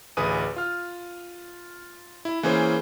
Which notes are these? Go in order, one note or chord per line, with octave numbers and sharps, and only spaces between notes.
A1 D2 G#4 B4 D#6 D#7
F4 F6
E4
E3 A#3 C#4 G#4 C5